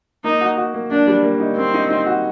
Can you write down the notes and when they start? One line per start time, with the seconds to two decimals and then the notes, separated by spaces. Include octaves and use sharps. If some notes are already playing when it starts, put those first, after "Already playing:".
0.24 A#3 D#4
0.41 F#4
0.57 F#4
0.74 A#3
0.91 A#3 D4
1.07 G3
1.24 A#3
1.40 D#4
1.57 A#3 C4
1.74 D#4
1.90 D#4
2.06 F#4